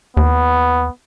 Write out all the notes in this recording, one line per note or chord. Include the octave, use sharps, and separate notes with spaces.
D#2 B3